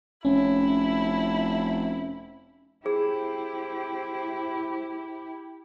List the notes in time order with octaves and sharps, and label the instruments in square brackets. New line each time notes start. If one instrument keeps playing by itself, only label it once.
[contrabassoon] F1 [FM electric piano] C#4 [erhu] E4
[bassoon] C4 [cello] E4 G4 [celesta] G#4